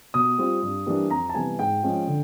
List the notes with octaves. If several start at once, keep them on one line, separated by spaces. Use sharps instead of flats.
B2 D#6
G3 C4 F4
G2
E3 G3 A#3 D4
F2 A#5
A5
C3 E3 G3 B3 G#5
G#2 G5
F3 G#3 C#4
D3